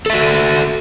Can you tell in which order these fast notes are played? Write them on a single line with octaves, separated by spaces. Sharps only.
A4 E5 F#4